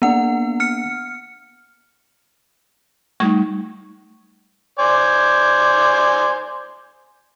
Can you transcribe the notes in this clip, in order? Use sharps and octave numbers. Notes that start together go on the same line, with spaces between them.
A#3 B3 D4 F#5
F6 C#7
G3 A3 D#4 C#6
C5 D5 G#5